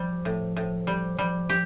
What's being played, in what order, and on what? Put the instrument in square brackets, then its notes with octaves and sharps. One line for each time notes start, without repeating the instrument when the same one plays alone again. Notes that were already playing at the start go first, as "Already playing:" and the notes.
Already playing: [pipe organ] F3 [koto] G3
[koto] A2
A2
G3
[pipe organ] F3 [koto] G3
[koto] G4